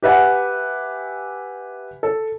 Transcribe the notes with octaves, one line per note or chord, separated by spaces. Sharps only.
G4 B4 E5 F#5 G#5
A4